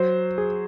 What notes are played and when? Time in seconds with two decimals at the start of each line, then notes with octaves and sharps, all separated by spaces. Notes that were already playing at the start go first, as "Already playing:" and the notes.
Already playing: F#3 C5
0.38 G#4